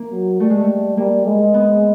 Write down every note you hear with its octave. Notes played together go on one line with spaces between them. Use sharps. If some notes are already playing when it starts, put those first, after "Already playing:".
Already playing: A#3
F#3
G3 A3
G#3
A3
G3 A#3
G#3
B3